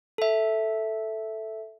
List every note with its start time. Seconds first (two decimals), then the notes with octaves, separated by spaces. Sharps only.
0.18 A4 E5